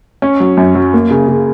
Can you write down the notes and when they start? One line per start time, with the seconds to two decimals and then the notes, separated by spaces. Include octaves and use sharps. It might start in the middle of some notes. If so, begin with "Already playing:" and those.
0.22 C#4
0.40 F#3
0.57 F#2
0.75 F#3
0.94 A#3
1.11 C#3
1.28 C#3